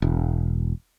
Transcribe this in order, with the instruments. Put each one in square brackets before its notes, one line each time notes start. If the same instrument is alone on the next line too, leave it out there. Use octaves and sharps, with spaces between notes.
[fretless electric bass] E1